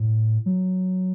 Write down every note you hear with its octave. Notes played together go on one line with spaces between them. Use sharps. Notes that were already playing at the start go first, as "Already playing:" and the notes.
Already playing: A2
F#3